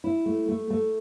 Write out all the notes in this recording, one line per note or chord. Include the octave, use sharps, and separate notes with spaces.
E4
A3
A3
A3